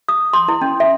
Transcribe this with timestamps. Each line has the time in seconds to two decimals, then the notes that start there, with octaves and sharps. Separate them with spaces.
0.08 D#6
0.33 C6
0.48 E4
0.61 C#4
0.80 E5